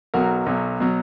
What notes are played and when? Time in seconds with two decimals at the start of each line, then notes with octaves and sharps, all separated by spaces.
0.14 B1 B2 F#3 F#4 A#4
0.46 B1 B2 F#3
0.80 B2 F#3